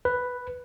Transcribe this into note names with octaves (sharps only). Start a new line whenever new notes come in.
B4